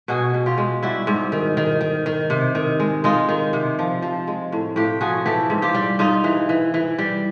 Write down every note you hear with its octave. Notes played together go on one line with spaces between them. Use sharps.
B2 F#4 G#4
B2
F4 G4
G#3
G3 E4 F#4
G#2
D#3
D#3
D#3
D#3
C3
D#3
G#3
G#3 D#4 F4
D#3
C3
F3
F3
G#3
A2
A2 F4 G4
F3 F#4 G#4
E3 G4 A4
G#2
F4 G4
G3
G#2 D#4 F4
E3
E3
E3
G3